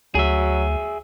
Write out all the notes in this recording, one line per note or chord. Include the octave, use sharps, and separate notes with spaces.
D2 F#3 G#4 E5